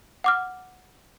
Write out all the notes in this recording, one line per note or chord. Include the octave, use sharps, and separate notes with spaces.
F#5 D6 F6